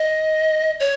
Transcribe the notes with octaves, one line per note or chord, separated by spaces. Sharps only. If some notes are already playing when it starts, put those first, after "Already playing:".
Already playing: D#5
C#5